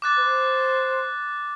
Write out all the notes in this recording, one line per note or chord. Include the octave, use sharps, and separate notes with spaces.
D6 F#6 A6
C5